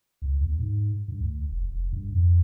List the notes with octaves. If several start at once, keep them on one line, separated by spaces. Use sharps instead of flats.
C#2
D#2
G#2
G2
D2
F1
F1
G2
F2